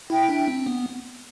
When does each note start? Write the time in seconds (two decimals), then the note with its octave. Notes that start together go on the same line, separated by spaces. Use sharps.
0.10 E4 E5 G5
0.29 D4
0.48 C4
0.66 B3